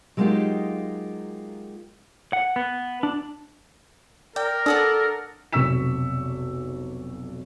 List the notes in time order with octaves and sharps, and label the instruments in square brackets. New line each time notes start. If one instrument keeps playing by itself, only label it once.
[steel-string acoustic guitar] F#3 G#3 A#3 D#4 F4 G4
[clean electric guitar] F#5
B3
D4
[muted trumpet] A#4 [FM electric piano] D5 [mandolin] G5
[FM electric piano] D4 [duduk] A4 [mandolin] D5 F#5 D#6
[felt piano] F1 B1 C#6 E6 B6 E7